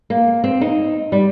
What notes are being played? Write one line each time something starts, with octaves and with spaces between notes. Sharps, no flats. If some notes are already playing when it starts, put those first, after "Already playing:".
A#3
C4
D#4
G3